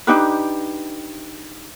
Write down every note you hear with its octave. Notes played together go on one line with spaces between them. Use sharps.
D4 D#4 G4 B4